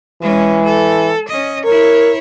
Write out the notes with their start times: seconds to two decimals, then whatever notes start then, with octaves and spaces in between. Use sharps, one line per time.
0.22 E3 G#3 C#4
0.65 A4
1.28 C#4 D#5
1.65 E4 A#4 C#5